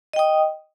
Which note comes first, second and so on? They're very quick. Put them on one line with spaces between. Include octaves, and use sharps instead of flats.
D#5 G5 D#6